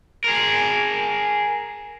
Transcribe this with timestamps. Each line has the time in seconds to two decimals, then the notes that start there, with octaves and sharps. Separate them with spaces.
0.24 G#4 A#4